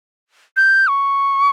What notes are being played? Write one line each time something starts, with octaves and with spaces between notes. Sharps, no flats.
G6
C#6